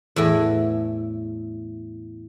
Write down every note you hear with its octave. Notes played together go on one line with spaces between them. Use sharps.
E2 A2 E4